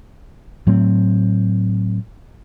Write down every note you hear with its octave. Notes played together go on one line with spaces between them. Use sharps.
A2 F#3 A3 C4